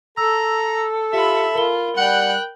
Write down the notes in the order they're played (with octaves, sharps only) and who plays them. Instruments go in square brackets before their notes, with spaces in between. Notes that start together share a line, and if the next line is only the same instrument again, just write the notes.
[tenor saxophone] A4 [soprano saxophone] A#5 [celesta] E6
[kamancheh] F4 B5 [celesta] G4 [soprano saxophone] E5
[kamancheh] F4 [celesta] A#4 B5 G7
[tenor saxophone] G3 [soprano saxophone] F#5 [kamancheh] G5 F#6